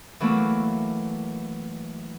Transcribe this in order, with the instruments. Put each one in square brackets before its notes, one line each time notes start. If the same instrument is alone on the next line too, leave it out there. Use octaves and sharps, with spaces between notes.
[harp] E3 F#3 A3 A#3